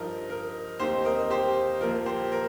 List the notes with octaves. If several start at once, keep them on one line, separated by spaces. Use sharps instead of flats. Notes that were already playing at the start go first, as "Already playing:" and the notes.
Already playing: G2 F3 D#4 A#4 D#5
A#4
D#2 D#3 C4 D#4 G4 C5
A#4 D#5
G4 C5
A#1 A#2 F3 A#4
G4 C5
A#4